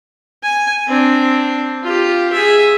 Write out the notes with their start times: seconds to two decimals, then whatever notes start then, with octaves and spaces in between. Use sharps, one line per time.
0.43 G#5
0.88 C4 D4
1.83 F4 G4
2.33 G#4 E5